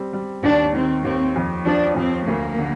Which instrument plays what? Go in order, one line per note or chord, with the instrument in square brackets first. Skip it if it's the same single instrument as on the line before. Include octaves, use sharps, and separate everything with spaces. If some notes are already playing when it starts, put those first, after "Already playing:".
Already playing: [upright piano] G3 C4
G3
[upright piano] D#2 [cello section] D4
[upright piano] D#3 [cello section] C4
[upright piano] D#2 [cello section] C4
[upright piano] F2
[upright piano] F3 [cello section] D4
[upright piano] F2 [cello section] C4
[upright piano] D2 [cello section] A#3
[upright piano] D3